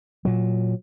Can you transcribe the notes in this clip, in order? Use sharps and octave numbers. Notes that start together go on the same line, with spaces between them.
A#2 F#3